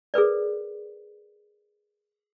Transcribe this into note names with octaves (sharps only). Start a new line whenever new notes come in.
G#4 A#4 B4 D5